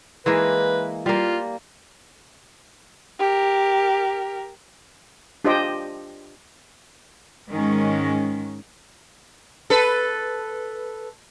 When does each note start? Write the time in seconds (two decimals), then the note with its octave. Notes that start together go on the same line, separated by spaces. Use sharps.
0.26 E3 G#3 A#3 B4
1.06 G3 A#3 F4
3.19 G4 A#4
5.44 D4 F4 G4 C5 D#5 G5
7.49 G#2 D#3 G#3 C#4
9.70 A4 B4